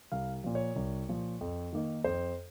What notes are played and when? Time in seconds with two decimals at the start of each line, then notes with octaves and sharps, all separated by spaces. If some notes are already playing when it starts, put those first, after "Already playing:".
0.12 C2 F5
0.44 A#2 F3
0.55 C#5
0.76 C2
1.09 A#2 F3
1.41 F2
1.73 D#3 A#3 D#4
2.04 F2 C5